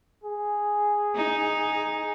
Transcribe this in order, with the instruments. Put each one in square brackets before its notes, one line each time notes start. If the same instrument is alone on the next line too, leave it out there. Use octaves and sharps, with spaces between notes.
[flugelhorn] G#4
[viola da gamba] D#4